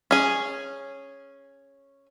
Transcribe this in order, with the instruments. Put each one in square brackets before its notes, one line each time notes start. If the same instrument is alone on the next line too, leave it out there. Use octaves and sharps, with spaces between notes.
[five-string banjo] C#4 G#4